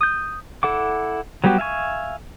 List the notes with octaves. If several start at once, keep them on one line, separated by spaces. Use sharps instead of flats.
D#6 G6
E4 A4 F#5 D6
F#3 G3 B3 F#4 G4
E5 F5 G#5 C#6